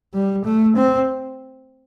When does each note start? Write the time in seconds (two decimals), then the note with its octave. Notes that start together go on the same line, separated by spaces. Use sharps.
0.14 G3
0.45 A3
0.76 C4